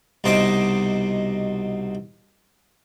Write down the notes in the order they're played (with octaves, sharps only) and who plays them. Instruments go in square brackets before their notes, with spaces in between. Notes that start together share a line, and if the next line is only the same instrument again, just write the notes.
[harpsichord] C2 B2 D#4 C5 D#5 D6